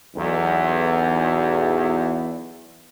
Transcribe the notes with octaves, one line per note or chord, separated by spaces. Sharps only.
B1 E2